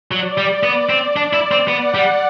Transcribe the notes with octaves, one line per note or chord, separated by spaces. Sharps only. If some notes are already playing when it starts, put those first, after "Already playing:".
F#3 D5
G3
B3
C4
D4 D5
E4
C4
B3 F#5
G3